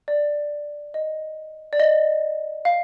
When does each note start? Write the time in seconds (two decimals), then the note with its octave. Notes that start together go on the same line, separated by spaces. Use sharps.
0.08 D5
0.94 D#5
1.73 D5
1.80 D#5
2.65 F5